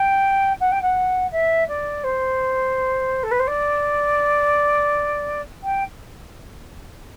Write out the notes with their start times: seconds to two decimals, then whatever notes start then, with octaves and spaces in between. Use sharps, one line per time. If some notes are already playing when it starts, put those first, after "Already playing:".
Already playing: G5
0.60 F#5
0.72 G5
0.82 F#5
1.31 E5
1.68 D5
2.04 C5
3.23 A4
3.31 B4
3.39 C5
3.47 D5
5.63 G5